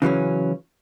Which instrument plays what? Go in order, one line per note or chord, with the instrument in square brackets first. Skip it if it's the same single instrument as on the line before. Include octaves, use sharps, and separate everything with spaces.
[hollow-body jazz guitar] C#3 E3 F#3 C#4